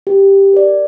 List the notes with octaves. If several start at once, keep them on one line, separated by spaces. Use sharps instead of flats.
G4
A#4 D5